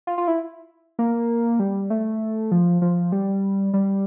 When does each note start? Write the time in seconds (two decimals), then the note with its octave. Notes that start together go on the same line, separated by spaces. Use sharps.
0.07 F4
0.18 F4
0.27 E4
0.99 A#3
1.59 G3
1.90 A3
2.51 F3
2.82 F3
3.12 G3
3.74 G3